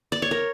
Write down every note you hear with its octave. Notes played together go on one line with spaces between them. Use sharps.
D5
C#5
A#4